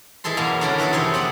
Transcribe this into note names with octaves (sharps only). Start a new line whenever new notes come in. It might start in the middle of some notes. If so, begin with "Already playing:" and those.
E3 G#3 G#4 A4 C6
F#2 B2 G#3 A#3 F#4 F5
D3 C#4 D4 E4 A4 A#4
D#3 E3 F#4 G#4 A4
F2 C3 G#4 C#5 D#5
F2 B3 G#4 D5 F#5